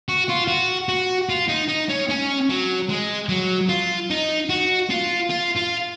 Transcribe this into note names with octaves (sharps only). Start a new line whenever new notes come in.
F#4
F4
F#4
F#4
F4
D#4
D#4
C#4
C#4
F#3
G#3
F#3
F4
D#4
F#4
F4
F4
F4